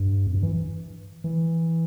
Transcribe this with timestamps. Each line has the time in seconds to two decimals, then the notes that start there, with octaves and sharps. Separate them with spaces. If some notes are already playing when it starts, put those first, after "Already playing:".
Already playing: G2
0.27 F2
0.35 G2
0.43 E3
1.24 E3